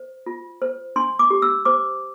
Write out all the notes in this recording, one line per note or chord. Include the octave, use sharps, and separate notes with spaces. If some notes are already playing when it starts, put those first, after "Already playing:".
Already playing: C5
F4
C5
D4 C6
D6
G4
E6
C5 D6